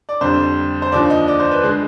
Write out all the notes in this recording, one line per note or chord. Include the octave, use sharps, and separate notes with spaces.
D5
F2 D3 G3 C5
C5
D#2 D3 F3 D5
D#5
D5
C5
B4
D3 G#3 G#4